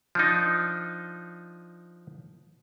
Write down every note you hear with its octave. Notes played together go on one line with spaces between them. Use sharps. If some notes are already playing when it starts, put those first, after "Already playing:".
F3 D4 D#4